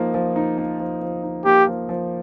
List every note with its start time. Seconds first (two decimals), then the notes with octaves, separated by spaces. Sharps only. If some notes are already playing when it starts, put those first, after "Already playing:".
Already playing: F3 A#3 D#4
0.14 F3
0.36 D#4
0.58 A#3
0.80 F3
1.01 F3
1.23 D#4
1.45 A#3 G4
1.67 F3
1.89 F3